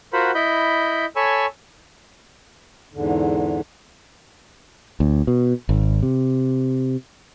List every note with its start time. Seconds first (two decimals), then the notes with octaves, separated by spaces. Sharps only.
0.13 F4 F#4 A#4 C5 F#5 B5
0.35 E4 D#5 B5 G6
1.16 A4 C#5 G#5 B5 C#6 E6
2.94 E2 G#2 D3
5.00 D2
5.27 B2
5.69 G#1
6.03 C3